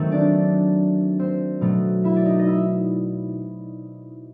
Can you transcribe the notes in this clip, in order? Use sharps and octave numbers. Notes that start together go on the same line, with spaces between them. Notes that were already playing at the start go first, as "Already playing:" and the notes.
Already playing: D#3 F#3 A3 C4
D4 D5
C4 C5
B2 F#3 A3
E4 E5
D5
D#4 D#5
D#5
E4 E5